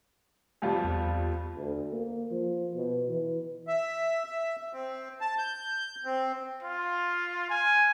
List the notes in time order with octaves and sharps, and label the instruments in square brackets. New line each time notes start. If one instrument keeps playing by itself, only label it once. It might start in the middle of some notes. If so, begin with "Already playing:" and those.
[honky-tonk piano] F2 G3 F4
[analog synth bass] E2
[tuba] D2
A#3
F3
B2
E3
[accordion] E5
E5
C4
A5
G6
C4
[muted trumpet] F4
G#5